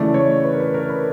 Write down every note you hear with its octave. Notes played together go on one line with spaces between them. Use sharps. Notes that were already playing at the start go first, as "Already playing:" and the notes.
Already playing: C#3 E3 A3 D5
C#5
B4
A#4
B4
A#4
B4